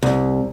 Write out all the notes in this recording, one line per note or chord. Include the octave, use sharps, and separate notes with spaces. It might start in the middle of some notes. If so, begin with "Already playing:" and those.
C2